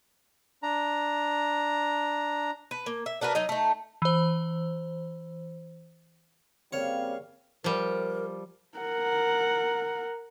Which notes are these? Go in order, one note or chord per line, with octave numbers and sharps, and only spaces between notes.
D4 A#5
B4
A#3
E5
D4 F#4 A#4 B4
F#3 D#4 D#5
A3 D#4
E3 C5
C#3 G3 A#3 C4 C#5 F5
F3 G3 A#4
A#4 F#5